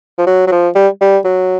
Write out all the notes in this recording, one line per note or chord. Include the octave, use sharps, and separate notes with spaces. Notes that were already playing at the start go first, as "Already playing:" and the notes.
F3
F#3
F#3
F3
G3
G3
F#3